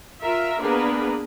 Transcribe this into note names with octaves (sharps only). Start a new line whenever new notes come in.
F4 A#4 E5
A#3 B3 D4 G#4 A#4 B4